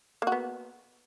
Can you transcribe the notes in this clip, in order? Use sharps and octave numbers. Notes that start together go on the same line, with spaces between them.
A#3 B3 F#4